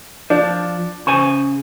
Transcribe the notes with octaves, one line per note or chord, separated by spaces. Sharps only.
F3 D4
C#3 C5 G#5 C#6